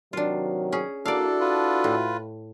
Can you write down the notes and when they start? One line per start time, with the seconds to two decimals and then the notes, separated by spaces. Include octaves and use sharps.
0.13 C3 D#3 F#3 D4 F4
0.72 C#4 G#4
1.05 A#3 D4 E4 F#4 A4 D5 F5
1.40 F4 B4
1.84 A2